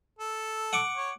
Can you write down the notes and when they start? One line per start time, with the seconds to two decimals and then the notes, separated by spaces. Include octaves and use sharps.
0.19 A4
0.73 F#5 C#6 D6
0.96 C#5